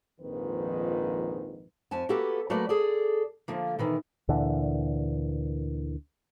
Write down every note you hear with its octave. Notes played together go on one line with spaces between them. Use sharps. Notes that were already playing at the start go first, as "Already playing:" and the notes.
A#1 F2 G#2 D#3 F3 B4
F2 G#5 A5
A#3 B3 F#4 G4 A4
F#3 A3 A#3 F#4 B4 D5
G#4 A4 D5
D3 F3 A#3
B2 D#3 E3 A#4
D2 A#2 D3 E3